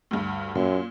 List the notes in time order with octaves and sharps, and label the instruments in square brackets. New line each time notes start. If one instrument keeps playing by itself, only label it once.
[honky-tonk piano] D2 G2
[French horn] F#2 [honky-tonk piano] A#2